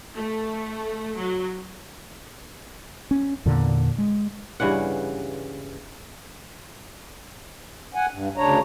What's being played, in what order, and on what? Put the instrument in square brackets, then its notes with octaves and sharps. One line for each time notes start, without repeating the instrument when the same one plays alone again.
[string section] A3
F#3
[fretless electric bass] C#4
E2 A#2 D3
G#3
[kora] G2 C#3 E3 F#5
[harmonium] F#5 G#5
G2
D2 C#3 D4 C#5 A#5